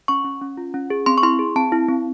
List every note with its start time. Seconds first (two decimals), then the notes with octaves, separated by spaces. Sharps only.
0.08 C#4 C#6
0.25 C#4
0.41 C#4
0.57 F4
0.74 C#4
0.90 G#4
1.06 C4 C6
1.18 C#6
1.23 E4 C6
1.39 G#4
1.56 C4 A5
1.72 E4
1.88 C4